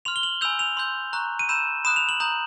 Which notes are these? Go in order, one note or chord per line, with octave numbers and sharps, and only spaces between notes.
C6 F6 F7
G7
F#7
G#5 B5 E6 G6 F7
F7
C6 E6 G6
A#5 C#6 F#6
D#7
B5 E6 G6 E7
B5 D#6 F#6 E7
F7
F#7
A#5 D#6 G6 F#7